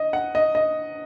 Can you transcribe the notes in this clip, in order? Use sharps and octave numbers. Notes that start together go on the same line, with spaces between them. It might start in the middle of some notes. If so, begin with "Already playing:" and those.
Already playing: D#5
F#5
D#5
D#5